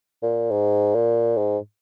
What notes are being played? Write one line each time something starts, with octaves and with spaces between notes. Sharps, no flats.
A#2
G#2
A#2
G#2